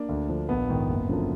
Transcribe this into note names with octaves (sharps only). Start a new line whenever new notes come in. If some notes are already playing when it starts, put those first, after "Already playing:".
Already playing: A#3 D4
D2
D3 F3
A#1 B3
G#2 D#3
F#1
F#2 D3 F3